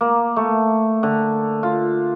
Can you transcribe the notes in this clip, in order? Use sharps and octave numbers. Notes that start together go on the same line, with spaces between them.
A#3
A3
D3
F4